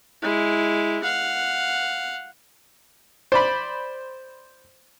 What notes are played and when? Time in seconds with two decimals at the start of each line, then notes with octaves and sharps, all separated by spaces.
0.22 G#3 E4
1.03 F5 F#5
3.32 C5 D5 B5